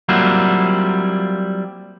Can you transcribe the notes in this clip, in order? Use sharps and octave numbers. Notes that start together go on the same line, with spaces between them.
F#3 G3 A#3 C4 E4 F4